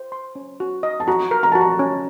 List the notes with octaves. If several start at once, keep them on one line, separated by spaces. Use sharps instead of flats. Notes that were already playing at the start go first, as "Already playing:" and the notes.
Already playing: C5
C6
C#4
F#4
D#5
A5
F#4 A#5
A#4
A#5
F#4 A5
A#5
C#4